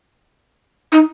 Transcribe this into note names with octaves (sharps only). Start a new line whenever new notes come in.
D#4